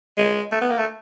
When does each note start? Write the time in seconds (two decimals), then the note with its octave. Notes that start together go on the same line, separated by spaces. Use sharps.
0.18 G#3
0.52 A3
0.61 B3
0.70 A#3
0.78 A3